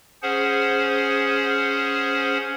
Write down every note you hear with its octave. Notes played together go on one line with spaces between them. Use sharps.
C#4 G#4 C5 F#5